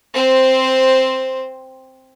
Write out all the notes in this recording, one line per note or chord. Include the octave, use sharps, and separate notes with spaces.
C4 C5